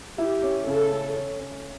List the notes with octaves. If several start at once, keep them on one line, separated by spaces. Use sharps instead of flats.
E4 G4
C#4
C#3 A4
C#4
C#4
C#4